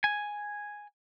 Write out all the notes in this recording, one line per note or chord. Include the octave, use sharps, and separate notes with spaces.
G#5